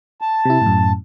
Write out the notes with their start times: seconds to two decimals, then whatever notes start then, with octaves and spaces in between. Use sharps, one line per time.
0.21 A5
0.45 C3 E4
0.62 F#2 A2